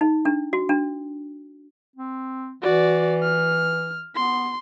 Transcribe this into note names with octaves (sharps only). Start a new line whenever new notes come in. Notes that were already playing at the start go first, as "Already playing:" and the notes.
D#4
D4
F#4
D4
C4
E3 F#4 D5
F6
B3 C6